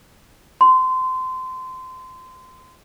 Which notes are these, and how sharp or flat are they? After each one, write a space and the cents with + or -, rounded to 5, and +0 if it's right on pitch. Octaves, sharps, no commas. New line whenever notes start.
C6 -25